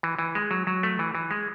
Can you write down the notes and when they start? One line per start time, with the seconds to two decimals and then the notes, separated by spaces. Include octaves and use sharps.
0.03 E3
0.19 E3
0.35 G#3
0.51 F#3
0.67 F#3
0.83 A3
0.99 E3
1.15 E3
1.31 G#3